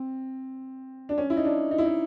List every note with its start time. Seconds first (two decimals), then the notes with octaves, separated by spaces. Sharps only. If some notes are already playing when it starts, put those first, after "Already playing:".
Already playing: C4
1.09 D4
1.18 C#4
1.30 E4
1.37 D#4
1.45 D4
1.71 D#4
1.78 E4
1.86 D#4